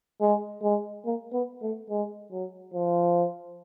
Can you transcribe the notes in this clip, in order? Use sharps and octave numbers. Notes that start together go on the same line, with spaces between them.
G#3
G#3
A#3
B3
A3
G#3
F#3
F3